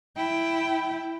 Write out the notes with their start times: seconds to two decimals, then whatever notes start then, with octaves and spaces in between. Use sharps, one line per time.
0.16 E4 G5